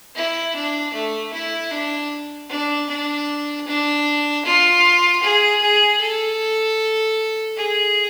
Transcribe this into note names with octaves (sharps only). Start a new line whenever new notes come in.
E4
D4
A3
E4
D4
D4
D4
D4
F4
G#4
G#4
A4
G#4